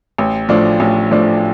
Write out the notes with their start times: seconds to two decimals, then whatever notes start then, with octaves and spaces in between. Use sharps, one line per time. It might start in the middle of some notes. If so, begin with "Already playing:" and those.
0.18 A1
0.49 A2 F3 D4
0.80 A1
1.11 A2 F3 D4